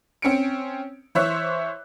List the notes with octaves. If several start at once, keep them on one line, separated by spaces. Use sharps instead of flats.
C4 C#4 C#7 D7
E3 C5 C#5 E5 F#6